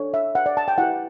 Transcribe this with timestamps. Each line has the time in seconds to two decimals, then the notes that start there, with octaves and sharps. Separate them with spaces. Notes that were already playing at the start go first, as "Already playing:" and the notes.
Already playing: D4 A4 C#5
0.14 E5
0.35 F#5
0.46 D5
0.57 A5
0.68 G5
0.78 E4 G4 B4 F#5